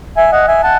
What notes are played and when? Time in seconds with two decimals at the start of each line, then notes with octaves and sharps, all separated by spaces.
0.17 E5 G#5
0.32 D#5 F#5
0.48 E5 G#5
0.63 F#5 A5